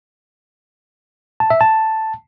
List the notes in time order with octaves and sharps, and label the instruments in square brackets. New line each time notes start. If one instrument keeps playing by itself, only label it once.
[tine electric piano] A5
E5
A5